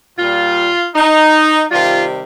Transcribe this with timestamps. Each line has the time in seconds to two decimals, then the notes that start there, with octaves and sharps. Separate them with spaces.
0.18 A#2 G3 F4
0.95 D#4
1.71 C3 D#3 G3 F4